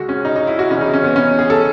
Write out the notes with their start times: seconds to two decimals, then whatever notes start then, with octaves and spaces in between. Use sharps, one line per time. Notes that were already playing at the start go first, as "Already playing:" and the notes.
Already playing: C#2 C#3 G#3 F#4
0.09 C#4
0.25 D#4
0.36 D#4
0.47 E4
0.59 F#4
0.70 E2 C#3 E3 C#4
0.81 D#4
0.93 C#4
1.04 B3
1.16 C#4
1.39 G#4
1.50 A4